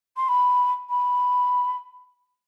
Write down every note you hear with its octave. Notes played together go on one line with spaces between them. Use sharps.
C6
B5
B5